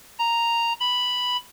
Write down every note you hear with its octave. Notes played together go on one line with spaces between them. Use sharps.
A#5
B5